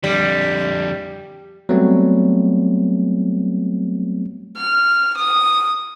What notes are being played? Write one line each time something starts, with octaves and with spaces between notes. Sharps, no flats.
F2 D3 G3
F#3 G3 A3 B3 C4
F6
D#6